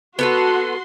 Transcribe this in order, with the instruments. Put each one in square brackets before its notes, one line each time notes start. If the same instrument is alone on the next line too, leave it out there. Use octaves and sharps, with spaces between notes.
[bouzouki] B3 A4 B4 [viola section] F#4 C6